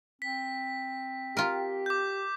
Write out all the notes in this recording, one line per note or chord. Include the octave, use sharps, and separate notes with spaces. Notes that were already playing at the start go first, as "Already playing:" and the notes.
C4 B6
F4 G4 A#4
D6 G6